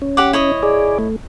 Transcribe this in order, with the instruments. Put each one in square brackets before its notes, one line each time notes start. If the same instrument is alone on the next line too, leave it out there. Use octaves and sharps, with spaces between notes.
[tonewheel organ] C#4
[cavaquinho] G4 F#5 D6
E4 C#5 D#5
[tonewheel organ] G#4 D5
A3